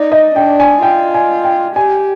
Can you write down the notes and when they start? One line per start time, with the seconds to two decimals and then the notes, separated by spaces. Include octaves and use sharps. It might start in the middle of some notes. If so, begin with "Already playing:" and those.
Already playing: D#4 D5
0.12 D#5
0.35 D4 G5
0.60 G#5
0.83 F4 G5
1.14 G#5
1.44 G5
1.76 G4 G#5